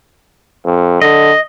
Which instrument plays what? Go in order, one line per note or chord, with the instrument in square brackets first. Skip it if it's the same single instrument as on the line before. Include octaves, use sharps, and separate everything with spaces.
[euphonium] F2
[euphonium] D3 [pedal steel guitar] D#5